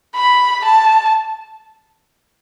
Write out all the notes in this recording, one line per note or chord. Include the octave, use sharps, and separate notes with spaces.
B5
A5